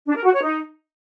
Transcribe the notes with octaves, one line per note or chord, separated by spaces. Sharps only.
D4
A#4
F#4
C#5
D#4